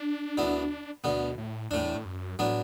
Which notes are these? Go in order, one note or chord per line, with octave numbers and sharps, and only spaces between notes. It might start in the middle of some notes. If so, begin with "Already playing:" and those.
Already playing: D4
D2 D3 B3 E4
D2 B2 D3 B3
A2
E2 A2 A3 D4
A2
F#2
A2 F#3 B3 D4